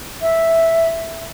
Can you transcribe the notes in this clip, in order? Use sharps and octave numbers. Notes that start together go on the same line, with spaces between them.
E5